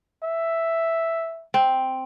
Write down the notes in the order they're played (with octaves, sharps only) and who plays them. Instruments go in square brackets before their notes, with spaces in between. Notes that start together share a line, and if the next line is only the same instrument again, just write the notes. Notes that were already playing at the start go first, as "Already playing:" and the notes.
[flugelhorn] E5
[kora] C4